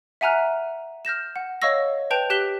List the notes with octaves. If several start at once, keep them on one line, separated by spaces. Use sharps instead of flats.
E5 F#5 G#5 A#5 F6 F#6
F6 G6 A#6 E7
F#5
C#5 D#5 F5 C#6 E6 A#6
B4 G5 A5 G6 D7 F7
G4 F#6 B6 G7